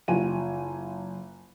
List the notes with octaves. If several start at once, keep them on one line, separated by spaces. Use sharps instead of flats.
F#1 F4 G#5 D#7